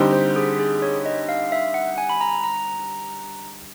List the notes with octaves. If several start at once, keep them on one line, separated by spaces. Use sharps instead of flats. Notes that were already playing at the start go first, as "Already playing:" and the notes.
Already playing: D3 G3 C4 D#4 G4
C5
G#4
G#4
C#5
D#5
F5
E5
F#5
G#5
B5
A#5
A#5